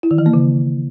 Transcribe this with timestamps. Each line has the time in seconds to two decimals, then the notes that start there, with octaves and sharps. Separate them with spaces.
0.03 E4
0.11 D#3
0.18 E3
0.26 A#3
0.34 C#3